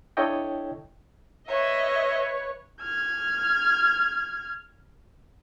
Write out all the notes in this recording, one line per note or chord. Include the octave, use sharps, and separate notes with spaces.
D4 E4 A4 C#5 D#5 G5
B4 C#5 D#5 E5
F6 G#6